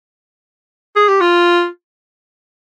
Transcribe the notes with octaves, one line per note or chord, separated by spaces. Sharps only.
G#4
G4
F4